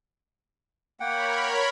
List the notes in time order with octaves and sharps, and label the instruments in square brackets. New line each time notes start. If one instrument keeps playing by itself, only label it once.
[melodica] A#3 F#5 G5 [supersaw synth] A#4 C#5 B5